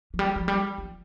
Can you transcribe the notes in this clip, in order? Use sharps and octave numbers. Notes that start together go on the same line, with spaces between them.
F3
G3
F3
G3
F3